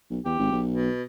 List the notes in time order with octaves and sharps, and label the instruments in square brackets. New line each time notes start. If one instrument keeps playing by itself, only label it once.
[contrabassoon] B1
[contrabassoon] E2 [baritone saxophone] G4
[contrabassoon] G#1
B1
[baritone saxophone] B2